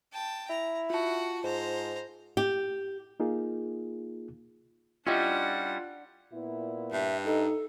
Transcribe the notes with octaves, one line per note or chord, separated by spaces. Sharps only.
G5 A5
E4 A#5
F4 F#4 F#5 A5
G#2 C5 A#5
G4
A#3 D#4 F4 G#4
G3 C#4 D4 E4 F4 G4 D#5 F#5
A#2 B3 E4
G2 E5
D#4 A4